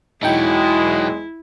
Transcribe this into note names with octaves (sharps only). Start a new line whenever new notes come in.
E2 B2 F#3 G#3 D#4 E4 G5